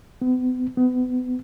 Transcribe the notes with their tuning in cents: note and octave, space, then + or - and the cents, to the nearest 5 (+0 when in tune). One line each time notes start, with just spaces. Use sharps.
B3 +40
B3 +30